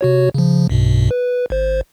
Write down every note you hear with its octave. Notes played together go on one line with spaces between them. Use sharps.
C3 F#4 C#5
C#3 F3
B1 G2 B2
B4
G#1 C5